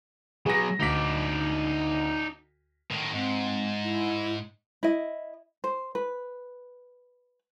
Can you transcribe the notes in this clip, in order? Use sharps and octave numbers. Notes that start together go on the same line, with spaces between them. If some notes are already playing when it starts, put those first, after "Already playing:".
F#3 B3 G#4 A#6
D2 D#4 D5 B6
A2 D#3
G#2 C4
E4
E4 D#5
C5
B4